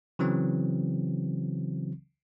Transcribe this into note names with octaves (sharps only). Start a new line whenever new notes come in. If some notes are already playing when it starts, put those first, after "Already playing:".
C#3 E3 F#3 C4